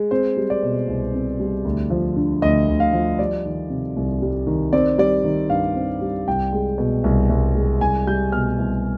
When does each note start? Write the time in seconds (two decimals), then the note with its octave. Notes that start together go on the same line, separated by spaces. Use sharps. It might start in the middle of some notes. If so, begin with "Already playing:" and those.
Already playing: G#3
0.11 C4 C5
0.37 G3
0.50 D5
0.63 B2
0.88 C2
1.14 C4
1.40 G3
1.65 D2
1.90 F3
2.16 D3
2.42 D2 D#5
2.68 D2
2.80 F5
2.93 F3
3.19 G3 D5
3.45 D#3
3.70 C3
3.96 C2
4.22 G3
4.47 D#3
4.73 C4 D5
4.98 G3 D5
5.24 D#3
5.50 G2 F5
5.75 C4
6.01 G3
6.27 C2 G5
6.53 G#3
6.78 B2
7.04 C2
7.30 C2
7.55 G#3
7.81 C2 G#5
8.07 G3 G6
8.32 B2 F6
8.59 C2